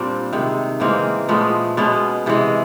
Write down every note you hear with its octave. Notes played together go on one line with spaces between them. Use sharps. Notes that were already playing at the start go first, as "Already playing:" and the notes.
Already playing: A#2 G3 C4 D4
C3 D#3 G#3
C#3 E3 G#3 A#3 C4
A#2 F3 G#3 A3 B3
B2 G#3 B3 C#4
C3 E3 G#3